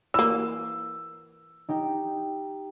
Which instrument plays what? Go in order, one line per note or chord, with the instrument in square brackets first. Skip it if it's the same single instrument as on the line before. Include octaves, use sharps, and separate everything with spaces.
[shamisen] E3 A#3 [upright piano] E6
[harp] D#4 G4 G5